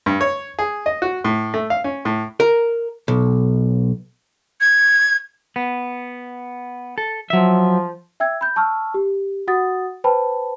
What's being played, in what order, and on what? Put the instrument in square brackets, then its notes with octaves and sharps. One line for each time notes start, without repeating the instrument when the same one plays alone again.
[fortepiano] G2
C#5
G#4
D#5
F#4
A2
A3
F5
C#4
A2
[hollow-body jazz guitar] A#4
B1
[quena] G#6
[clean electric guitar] B3
A4
[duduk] F3 [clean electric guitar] F#3 E5
[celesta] E5 G5 E6 G#6
B5 G6
A5 C#6 E6 F6
G4
F#4 F#5 D#6 A6
B4 C5 G5 A5 B5